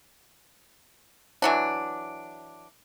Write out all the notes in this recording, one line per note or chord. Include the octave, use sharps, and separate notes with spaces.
E3 F#3 D4